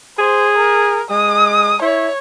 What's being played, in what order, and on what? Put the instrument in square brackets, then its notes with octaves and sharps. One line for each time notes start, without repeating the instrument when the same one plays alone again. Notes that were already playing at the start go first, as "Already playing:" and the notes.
[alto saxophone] G#4 [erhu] C5
[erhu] A#4
[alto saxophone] G#3 [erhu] D#6
[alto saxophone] E4 [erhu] C#5